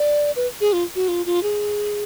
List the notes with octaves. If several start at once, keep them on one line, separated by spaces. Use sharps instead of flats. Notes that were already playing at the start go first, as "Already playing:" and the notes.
Already playing: D5
B4
G#4
F4
F#4
F4
F4
G#4